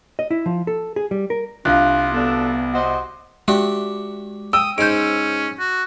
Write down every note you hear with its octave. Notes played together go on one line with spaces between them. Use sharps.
D#5
E4
F3
A4
G#4
G3
A#4
C2 D4 F4 F5 F#6
D2 B3 D4 A4
F#4 C5 D#5
G#3 D4 F#4 G4
G5 D#6 E6
G#2 C#4 C5 G6 D7
F#4